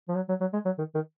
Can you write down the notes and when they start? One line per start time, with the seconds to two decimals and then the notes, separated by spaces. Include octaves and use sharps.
0.08 F3
0.16 F#3
0.29 F#3
0.41 F#3
0.53 G#3
0.65 F#3
0.78 D#3
0.94 D#3